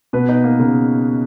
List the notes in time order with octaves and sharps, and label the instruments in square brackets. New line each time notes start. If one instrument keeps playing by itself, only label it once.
[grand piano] B2 [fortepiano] B4
[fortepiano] D#4
A#3
[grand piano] C#3 [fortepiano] A#3